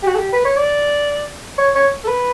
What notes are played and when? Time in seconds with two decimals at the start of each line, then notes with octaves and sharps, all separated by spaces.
0.03 G4
0.07 F#4
0.15 A4
0.19 G4
0.33 B4
0.45 C#5
0.57 D5
1.58 C#5
1.75 C#5
2.04 A4
2.08 B4